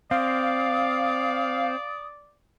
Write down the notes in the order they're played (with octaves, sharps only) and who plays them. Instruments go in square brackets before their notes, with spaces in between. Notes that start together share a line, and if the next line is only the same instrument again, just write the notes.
[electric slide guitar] C4 [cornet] D5 [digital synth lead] F5 [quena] D#6